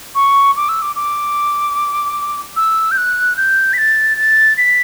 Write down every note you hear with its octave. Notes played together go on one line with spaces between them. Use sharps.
C#6
D6
E6
D6
D6
E6
G6
F#6
G6
B6
A6
A6
B6